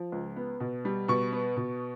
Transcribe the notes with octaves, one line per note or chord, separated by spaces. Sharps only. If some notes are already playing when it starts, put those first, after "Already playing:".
Already playing: F3
C#2
B3
B2
G3
B2 C#6
B3
B2